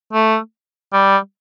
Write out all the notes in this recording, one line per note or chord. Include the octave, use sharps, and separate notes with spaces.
A3
G3